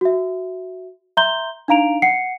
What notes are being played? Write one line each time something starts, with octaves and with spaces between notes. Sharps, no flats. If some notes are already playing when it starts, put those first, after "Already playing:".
F#4 E5
E5 A#5 C6 G6 G7
D4 D#4 F5 A#5 D7 F7
F#5 C7 C#7